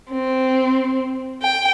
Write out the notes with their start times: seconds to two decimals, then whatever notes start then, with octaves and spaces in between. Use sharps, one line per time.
0.11 C4
1.42 G5